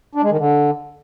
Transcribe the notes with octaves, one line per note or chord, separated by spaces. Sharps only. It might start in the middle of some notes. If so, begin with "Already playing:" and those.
D4
G#3
D#3
D3